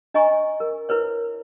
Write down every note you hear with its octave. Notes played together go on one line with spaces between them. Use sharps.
D4 D#5 G#5 A#5 C#6
A#4
E4 A#4 B4 C#5